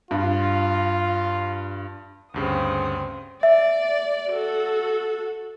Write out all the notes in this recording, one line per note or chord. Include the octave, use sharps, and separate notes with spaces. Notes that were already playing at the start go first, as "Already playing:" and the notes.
G2 F4
D2 G2 C#3 C4 D#6
D5 E5
F#4 A4